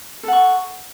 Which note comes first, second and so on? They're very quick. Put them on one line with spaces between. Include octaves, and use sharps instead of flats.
A4 F#5 C#6